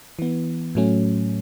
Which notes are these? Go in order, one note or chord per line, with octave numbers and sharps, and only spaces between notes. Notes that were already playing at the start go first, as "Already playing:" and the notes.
E3 B3
A2 F#3 A3 C#4